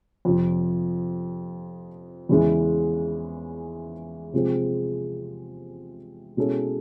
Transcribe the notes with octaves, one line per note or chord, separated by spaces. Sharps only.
F2 C3 F3
E2 C#3 E3 G#3
C3 F3 G#3 C4
B2 G#3 C#4 E4 A4